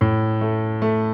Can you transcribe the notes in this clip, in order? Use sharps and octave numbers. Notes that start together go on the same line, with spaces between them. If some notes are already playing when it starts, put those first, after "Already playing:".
A2
A3
A3